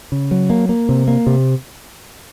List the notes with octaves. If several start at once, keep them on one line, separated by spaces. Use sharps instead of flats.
C#3
F#3
A#3
A#3
C3
A#3
C3